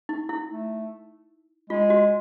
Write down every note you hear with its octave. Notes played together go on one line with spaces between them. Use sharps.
D#4
E4
A3
G#3 F4
F#4